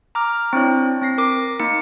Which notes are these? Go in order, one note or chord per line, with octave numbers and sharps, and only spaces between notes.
A#5 D6 F6
C4 D4 E4 C#5
C4 A#6 C7
A#4 D6
A#3 D#4 C#7